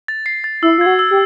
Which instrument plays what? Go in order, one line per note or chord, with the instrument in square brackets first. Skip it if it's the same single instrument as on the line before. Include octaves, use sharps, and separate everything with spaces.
[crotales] A6
C7
A6
[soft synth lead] E4 [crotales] E6
[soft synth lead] F4 [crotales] G#6
[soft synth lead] F#4
[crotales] E6
[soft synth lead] G4